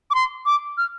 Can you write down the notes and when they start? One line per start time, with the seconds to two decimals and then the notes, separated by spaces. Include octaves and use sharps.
0.11 D6
0.15 C6
0.46 D6
0.78 F6